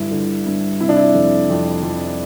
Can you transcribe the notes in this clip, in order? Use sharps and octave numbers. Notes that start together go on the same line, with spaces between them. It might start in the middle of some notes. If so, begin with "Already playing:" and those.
Already playing: G2 D3 E4
D3
G2
C3 E4
D4
E4
F2
F2
F2